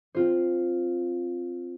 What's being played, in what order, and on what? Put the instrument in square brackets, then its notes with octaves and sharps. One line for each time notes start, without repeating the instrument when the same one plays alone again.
[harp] C4 F4 C5